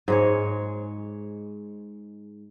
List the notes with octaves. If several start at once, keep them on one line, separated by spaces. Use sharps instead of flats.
G#2 G#3 C#5